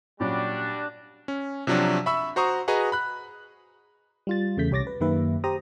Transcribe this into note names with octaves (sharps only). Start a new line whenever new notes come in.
A#2 F#3 G3 C#4 D4 F#4
C#4
C3 F3 F#3 D4 F#4
E5 B5 C#6 E6
F#4 C5 A#5 C#6 D#6
F#4 G#4 B4 D#5 A#5
B5 F#6
G3 F4 A6
E2 C#3 A3 G6 B6
C2 G4 C#5 D6 A6 A#6
B4
F#2 D#3 A#3 G4 B4 E5
G4 C5 A#5 D#6